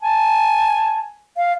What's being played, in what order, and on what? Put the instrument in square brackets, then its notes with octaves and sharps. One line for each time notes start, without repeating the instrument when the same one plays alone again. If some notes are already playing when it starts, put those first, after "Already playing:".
[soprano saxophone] G#5 [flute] A5
[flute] F5